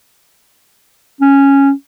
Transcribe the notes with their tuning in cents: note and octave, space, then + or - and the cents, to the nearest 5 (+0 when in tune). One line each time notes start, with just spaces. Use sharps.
C#4 -5